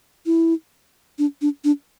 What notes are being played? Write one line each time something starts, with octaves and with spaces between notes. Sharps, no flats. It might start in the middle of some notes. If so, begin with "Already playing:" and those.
E4
D4
D4
D4